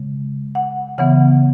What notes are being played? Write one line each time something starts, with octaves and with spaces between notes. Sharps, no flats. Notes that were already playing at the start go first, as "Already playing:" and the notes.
Already playing: C#3 G#3
F#5
C#3 E3 B3 F#5